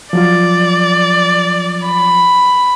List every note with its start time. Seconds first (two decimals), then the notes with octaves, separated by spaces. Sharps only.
0.13 F3 F#3 F4 D5
1.84 B5